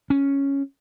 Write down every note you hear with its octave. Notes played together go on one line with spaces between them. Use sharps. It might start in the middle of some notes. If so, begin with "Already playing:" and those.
C#4